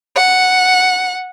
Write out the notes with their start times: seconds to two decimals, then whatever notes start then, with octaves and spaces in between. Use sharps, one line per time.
0.15 F#5